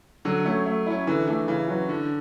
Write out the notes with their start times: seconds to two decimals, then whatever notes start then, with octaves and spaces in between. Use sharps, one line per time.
0.25 D3 F#3
0.45 A3 C#4
0.66 A3
0.86 C#4 E4
1.07 D3 E3
1.27 E3 A3 D4 A4
1.48 C#3 E3
1.68 F#3 C#4 F#4 B4
1.89 D3 E3